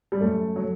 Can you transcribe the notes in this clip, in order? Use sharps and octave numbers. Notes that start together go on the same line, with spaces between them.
G3
F#2 A3
F#3